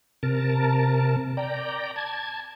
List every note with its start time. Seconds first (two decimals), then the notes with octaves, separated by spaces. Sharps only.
0.23 C3 A#4 A5
1.37 D5 G5 A#5
1.96 A5 G#6